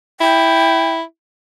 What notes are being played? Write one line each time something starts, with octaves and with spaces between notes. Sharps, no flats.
E4 G5